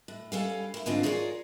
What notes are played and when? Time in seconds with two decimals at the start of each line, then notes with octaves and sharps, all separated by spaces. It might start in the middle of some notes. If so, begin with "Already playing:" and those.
0.08 A2
0.32 G3 C#4 A4 B4 F5
0.74 A#3 E4
0.86 G#2 D3 G#3 B3 C4 F4
1.03 F4 G#4 A#4 B4 C#5 D5